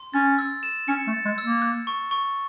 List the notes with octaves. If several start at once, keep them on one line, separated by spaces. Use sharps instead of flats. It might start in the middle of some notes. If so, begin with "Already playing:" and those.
Already playing: C6
C#4 A6
E6
E7
C#4 C#7
A3
A6
G#3
E6
A#3
F#6
C#6
C#6